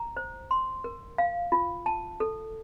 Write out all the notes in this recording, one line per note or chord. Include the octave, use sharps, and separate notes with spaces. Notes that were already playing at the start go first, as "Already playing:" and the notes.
Already playing: A#5
C5
C6
A#4
F5
F4
A5
A4